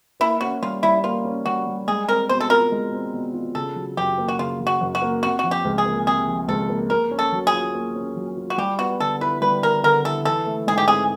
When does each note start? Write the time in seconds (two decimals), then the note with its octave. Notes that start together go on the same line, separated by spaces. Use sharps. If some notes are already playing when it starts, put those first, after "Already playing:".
0.20 A#3 E4
0.41 C#4 F#4
0.62 G3 F4
0.83 G3 E4
1.04 A#3 F4
1.25 C#4
1.46 G3 F#4
1.67 G3
1.88 G#3 G#4
2.09 C4 A#4
2.29 B2 C5
2.40 A4
2.50 F4 A#4
2.72 G#3
2.93 C4
3.13 B2
3.34 F4
3.55 C#3 A4
3.76 F#3
3.97 F#2 G4
4.18 A#3
4.28 F#4
4.39 C#3 F4
4.60 F#3
4.67 F#4
4.81 F#2
4.95 F#4
5.02 A#3
5.23 C3 F#4
5.39 F3 F#4
5.51 G4
5.65 C#2
5.78 G#4
5.86 A#3
6.07 C3 G#4
6.28 F3
6.48 C#2 A4
6.69 A#3
6.90 A#3 A#4
7.11 C#4
7.19 A4
7.32 F#3
7.47 G#4
7.53 F4
7.74 A#3
7.95 C#4
8.16 F#3
8.37 F4
8.50 F#4
8.58 G3 G4
8.79 B3 F#4
9.00 D3 A4
9.21 E4 B4
9.41 G3 B4
9.63 B3 A#4
9.84 D3 A#4
10.05 E4 A4
10.25 E3 A4
10.46 A3
10.67 G#2 G#4
10.78 G4
10.88 C4 G#4